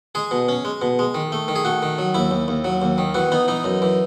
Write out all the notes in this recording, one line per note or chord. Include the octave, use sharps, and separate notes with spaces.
G#3 G#4
B2
C#4
G#3
B2
G#3
D#3
A3
D#3
G#4
A3 F#4
D#3
F#3
D#2 E4
D#2
D#2
F#3
D#2
D#3
E3 F#4
B3 D#4
E3 D#4
F#2
E3